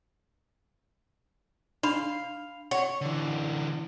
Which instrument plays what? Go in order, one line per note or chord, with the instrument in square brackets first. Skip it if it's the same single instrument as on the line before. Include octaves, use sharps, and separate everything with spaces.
[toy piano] D4 B5 [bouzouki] F5
[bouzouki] C#5 [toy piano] F#5
[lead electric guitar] D3 E3